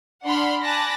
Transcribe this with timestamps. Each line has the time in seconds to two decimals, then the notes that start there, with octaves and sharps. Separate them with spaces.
0.25 D4 F#5 B5 C6 F6
0.63 G#5 A5 B5 D6 F#6 A#6